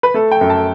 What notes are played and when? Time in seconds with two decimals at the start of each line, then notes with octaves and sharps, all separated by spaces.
0.03 B4
0.14 A3 A4
0.32 G5
0.41 F#2
0.50 A5